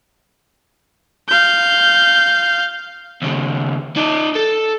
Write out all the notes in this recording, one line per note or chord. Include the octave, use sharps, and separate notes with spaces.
F5 G6
D#2 C#3
D#4 D5
A4